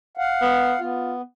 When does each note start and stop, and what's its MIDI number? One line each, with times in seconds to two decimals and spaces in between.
0.17 0.80 77
0.17 0.80 78
0.42 0.74 59
0.80 1.22 59
0.80 1.13 65